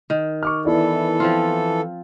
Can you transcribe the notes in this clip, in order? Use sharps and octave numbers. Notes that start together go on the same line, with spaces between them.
D#3
C#6 D6 F6
E3 B3 E4 A4 D5
F3 C4 F4